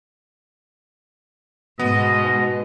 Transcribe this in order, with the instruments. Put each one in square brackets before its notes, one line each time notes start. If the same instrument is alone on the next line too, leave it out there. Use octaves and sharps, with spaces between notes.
[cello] G#2 [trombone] B2 [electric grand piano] B3 [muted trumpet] D#5